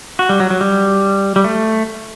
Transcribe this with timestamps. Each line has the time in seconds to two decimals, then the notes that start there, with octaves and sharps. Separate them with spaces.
0.19 F#4
0.29 G3
0.40 F#3
0.50 F#3
0.61 G3
1.36 G3
1.44 A3